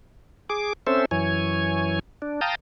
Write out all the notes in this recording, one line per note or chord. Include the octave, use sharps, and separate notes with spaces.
G#4 D6
C4 C#4 A4 C5 E5
F#2 E3 C#5 G#5
D4
F5 G5 A5 A#5 D#6